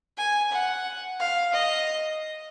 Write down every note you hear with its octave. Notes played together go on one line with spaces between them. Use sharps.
G#5
F#5
F5
D#5